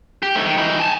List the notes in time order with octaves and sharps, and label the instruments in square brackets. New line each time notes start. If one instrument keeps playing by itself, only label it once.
[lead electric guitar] G4
G#2 A3
D#3
E3 D#4
G#5 A5